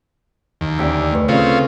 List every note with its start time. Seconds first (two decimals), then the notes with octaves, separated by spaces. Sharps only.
0.61 D#2
0.79 D2 C#4 G4 D5 E6
1.11 A3 B4
1.29 C#3 C4 C#4 F4 A4 C#5